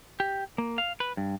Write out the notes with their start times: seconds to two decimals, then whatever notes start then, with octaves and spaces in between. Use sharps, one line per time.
0.20 G4
0.58 A#3
0.78 F5
1.00 B4
1.17 G2